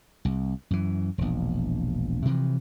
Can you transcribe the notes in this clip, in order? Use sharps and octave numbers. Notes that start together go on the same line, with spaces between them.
C2
F#2 E3
E1 A#1
C3 E3 F3